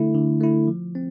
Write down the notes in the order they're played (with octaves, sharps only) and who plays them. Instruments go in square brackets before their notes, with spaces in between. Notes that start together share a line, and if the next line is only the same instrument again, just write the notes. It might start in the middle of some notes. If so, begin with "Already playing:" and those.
Already playing: [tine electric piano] D3 A3 E4
D3
A3 E4
F3
C4